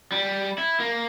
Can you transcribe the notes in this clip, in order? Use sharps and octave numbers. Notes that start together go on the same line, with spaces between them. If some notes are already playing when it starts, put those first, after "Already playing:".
G3
E4
A#3